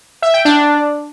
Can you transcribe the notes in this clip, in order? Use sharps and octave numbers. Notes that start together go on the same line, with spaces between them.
E5
G5
D4